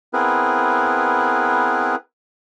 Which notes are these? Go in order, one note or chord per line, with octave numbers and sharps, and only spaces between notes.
B3 C4 E4 G#4 A#4 B4